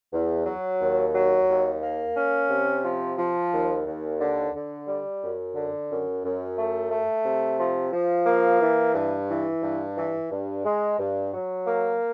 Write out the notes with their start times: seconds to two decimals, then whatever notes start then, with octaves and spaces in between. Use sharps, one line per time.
0.12 E2
0.46 F#3
0.79 D#2
1.14 F#3
1.48 D#2
1.81 A#3
2.16 C#4
2.49 C3
2.84 F3
3.17 F3
3.52 D#2
3.86 D#2
4.20 D3
4.53 D3
4.87 G3
5.22 F#2
5.55 D3
5.89 F#2
6.23 F#2
6.57 A3
6.91 A3
7.25 C3
7.59 F3
7.93 F3
8.26 A#3
8.61 E3
8.94 G2
9.29 E3
9.62 G2
9.96 E3
10.30 G2
10.64 G#3
10.99 G2
11.33 F#3
11.66 A#3